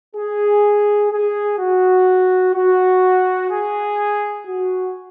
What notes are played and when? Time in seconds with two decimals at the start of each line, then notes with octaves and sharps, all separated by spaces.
0.16 G#4
1.12 G#4
1.59 F#4
2.55 F#4
3.50 G#4
4.45 F#4